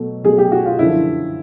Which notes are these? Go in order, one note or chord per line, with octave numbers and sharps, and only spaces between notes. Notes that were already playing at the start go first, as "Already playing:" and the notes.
Already playing: B2 F#3 A3
B2 F#3 A3 G#4
G4
F#4
F4
F#2 D3 F3 E4